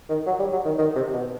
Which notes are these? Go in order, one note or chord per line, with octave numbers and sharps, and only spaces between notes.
D#3
F#3
G3
F#3
D#3
D#3
C3
B2